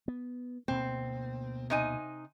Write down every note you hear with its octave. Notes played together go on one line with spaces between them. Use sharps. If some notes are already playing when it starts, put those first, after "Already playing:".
B3
D2 B2 A#3 C4
C3 D#4 G#5